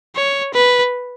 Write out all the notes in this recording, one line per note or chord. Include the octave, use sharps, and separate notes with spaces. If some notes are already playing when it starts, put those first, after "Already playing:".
C#5
B4